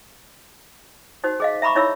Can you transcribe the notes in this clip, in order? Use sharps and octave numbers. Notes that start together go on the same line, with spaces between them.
D#4 F#4 C5
G#4 D#5 F5
E5 A#5 B5 C#6 D6
D#4 E4 C#5 E5 B5 E6